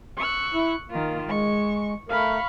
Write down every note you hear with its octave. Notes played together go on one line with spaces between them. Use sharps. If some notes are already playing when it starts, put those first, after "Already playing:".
C#6 E6 F#6
E4
D#3 A#3 F4
G#3 C#6
A3 A#4 F5 B5 C#6